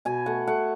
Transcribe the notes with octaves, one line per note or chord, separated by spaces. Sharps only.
B2 G#5
A3 F#5
A3 F#5